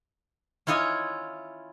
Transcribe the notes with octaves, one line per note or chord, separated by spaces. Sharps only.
C#4 E4 F4 C#5 D#5 G#5